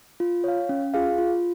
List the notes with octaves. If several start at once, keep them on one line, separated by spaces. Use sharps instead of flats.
F4
C#5 F5
C#4
F4 G#4 F5
F4